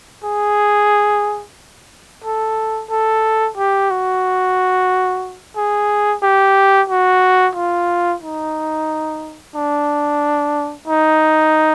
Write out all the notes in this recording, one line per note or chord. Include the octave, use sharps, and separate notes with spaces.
G#4
A4
A4
G4
F#4
G#4
G4
F#4
F4
D#4
D4
D#4